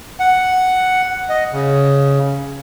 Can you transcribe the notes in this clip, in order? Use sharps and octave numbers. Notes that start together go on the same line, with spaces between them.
F#5
D#5
C#3